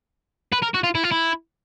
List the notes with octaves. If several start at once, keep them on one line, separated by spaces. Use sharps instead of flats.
B4
A#4
F#4
F4
E4
F4
E4